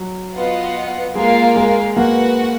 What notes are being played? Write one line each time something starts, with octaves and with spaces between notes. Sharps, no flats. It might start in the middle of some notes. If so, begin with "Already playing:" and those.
Already playing: F#3
B3 F4 B4 D#5 F#5
G#3 A#3 F4 A#4 F5
G#3
A#3 F#4 B4 F#5